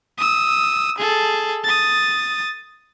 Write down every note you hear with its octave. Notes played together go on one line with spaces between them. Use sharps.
D#6 E6
G#4 A4
D#6 A6